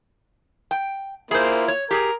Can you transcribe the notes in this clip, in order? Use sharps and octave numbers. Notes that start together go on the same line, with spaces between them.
G5
A#3 E4 F4 G#4 C5
C#5
G4 G#4 A#4